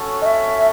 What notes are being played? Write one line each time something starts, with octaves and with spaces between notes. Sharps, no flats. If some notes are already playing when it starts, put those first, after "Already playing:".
Already playing: C#4 F#4 A4 C#5
D#5
E5